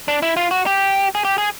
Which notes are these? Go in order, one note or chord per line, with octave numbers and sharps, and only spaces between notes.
D4
E4
F4
F#4
G4
G#4
G4
G#4